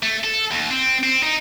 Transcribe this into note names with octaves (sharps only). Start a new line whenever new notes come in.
A3
A4
D#2
C4
C4
D#4